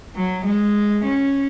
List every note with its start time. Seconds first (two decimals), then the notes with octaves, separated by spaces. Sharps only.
0.15 F#3
0.45 G#3
1.04 C#4